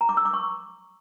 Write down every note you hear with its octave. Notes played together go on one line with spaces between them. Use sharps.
A#5
D6
E6
D6
C#6